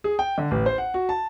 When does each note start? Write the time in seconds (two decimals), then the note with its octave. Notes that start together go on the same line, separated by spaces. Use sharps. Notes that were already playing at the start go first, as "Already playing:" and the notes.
0.04 G#4
0.19 G5
0.38 D3
0.51 A1
0.66 C5
0.78 F#5
0.94 F#4
1.09 A5